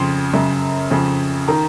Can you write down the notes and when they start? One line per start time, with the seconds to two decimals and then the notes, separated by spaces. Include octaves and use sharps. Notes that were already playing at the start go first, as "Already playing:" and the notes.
Already playing: F2 C#3 C6
0.33 F#2 C#3
0.91 F2 C#3
1.48 D#3 A#5